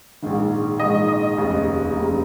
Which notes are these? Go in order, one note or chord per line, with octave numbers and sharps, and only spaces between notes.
A#1 G#2 D#3
A#1 G#2 D#3 D#5
D#5
F1 D#2 C#3
F1 D#2 C#3